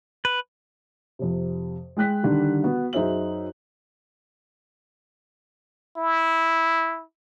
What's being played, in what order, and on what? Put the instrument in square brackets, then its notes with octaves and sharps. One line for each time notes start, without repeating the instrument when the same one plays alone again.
[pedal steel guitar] B4
[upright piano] F2 C3
G#3 G5 F#6 B6
D3 D#3 G3
B3 F#4
F#2 D#4 G#4 C5 E5 F#7
[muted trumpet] E4